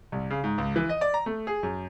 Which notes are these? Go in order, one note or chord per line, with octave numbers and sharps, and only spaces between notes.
C2
C#3
G#2
C#2
E3
D#5
D5
A#5
A3
G#4
F#2